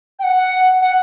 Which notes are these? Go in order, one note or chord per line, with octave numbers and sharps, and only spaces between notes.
G5
F#5
F#5